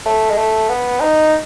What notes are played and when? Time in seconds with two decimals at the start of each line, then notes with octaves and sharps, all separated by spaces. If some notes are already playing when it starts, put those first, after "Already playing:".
0.06 A3
0.30 G#3
0.37 A3
0.69 B3
1.00 D#4